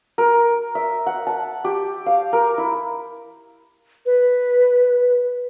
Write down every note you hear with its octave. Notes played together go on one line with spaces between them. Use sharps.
A#4
E5
F#5
A5
G4
F5
A#4
E4
B4